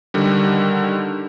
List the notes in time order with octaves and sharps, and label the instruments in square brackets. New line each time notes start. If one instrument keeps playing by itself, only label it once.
[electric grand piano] D3 D#3 G3